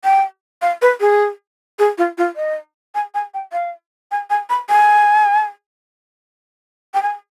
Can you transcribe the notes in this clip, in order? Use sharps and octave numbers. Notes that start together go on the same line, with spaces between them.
G5
F5
B4
G#4
G#4
F4
F4
D#5
G#5
G#5
G5
F5
G#5
G#5
B5
G#5
G5
G#5